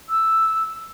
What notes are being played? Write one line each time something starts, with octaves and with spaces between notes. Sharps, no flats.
E6